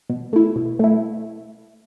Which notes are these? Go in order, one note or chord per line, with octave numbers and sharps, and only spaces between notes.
B2
A3 E4
B2
A3 E4